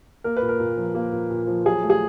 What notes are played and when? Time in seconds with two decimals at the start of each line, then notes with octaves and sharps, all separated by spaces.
0.24 A#3 A#4
0.37 B4
0.42 A#2
0.49 A#4
0.60 A#2
0.77 F3
0.95 A#3
1.12 A#2
1.31 A#2
1.47 F3
1.65 F#3 G#4
1.83 A3
1.90 G#4